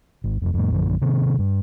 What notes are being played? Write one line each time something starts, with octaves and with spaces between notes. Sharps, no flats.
G#1
F1 F2
F2 A2
A#1 F#2 D3 F3
C3 D#3 B3
G2